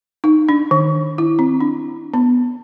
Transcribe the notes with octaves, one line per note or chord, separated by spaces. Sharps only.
D#4
D4
D#3
E4
C4
D4
B3